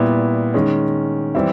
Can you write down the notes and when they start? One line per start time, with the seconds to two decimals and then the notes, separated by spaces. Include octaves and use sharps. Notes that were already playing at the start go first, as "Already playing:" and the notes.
Already playing: A#2 G3 B3 E4
0.54 D#3 G#3 C#4
1.35 E3 G3 C4 E4